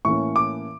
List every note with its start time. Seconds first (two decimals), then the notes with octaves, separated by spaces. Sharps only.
0.05 A2 E3 A#3 C#4 C#6
0.36 D6